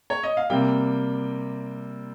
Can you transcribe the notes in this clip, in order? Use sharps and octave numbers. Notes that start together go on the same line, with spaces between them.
C#5
D#5
F5
C3 G3 A#3 G5